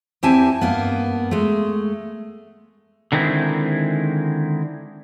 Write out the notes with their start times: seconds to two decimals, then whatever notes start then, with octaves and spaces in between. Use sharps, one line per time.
0.23 E2 C4 E4 G4 G#5 A5
0.61 G2 A#3 B3
1.31 G#3 A3
3.12 D3 D#3 G#3 C4 E4